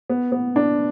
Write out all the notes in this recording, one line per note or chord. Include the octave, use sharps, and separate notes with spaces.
B3
B3
D4